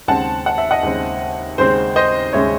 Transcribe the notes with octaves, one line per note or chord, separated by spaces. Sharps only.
D#2 C#3 G#3 C4 F#5 A5
F#5
E5
D#5 F#5
D#2 C#3 G#3 C4
D#2 C#3 G#3 C4 C5
C5 D#5
D#2 C#3 G#3 C4 C#5 E5